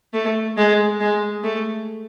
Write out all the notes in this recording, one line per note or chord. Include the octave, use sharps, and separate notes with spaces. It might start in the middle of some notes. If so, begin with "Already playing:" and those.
A3
G#3
G#3
A3